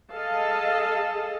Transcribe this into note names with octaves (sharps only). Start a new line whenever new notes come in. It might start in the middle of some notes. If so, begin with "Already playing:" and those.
G#4 A4 D#5 F5 A5